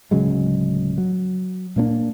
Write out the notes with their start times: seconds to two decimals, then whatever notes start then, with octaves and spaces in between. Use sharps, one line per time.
0.11 D1 C#3 F#3 G#3
0.98 F#3
1.76 A#2 A#3 C#4 D4